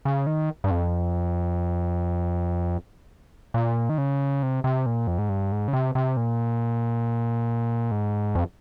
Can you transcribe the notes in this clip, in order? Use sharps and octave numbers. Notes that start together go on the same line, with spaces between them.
C#3
D#3
G2
F2
A#2
D#3
C#3
C3
C3
A#2
F2
G#2
G2
G#2
C#3
C3
C3
A#2
G#2
F2